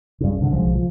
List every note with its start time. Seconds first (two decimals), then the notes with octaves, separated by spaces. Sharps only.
0.21 G2 C#3
0.38 C2 D3
0.52 B1 C#3 F3 G#3
0.75 F3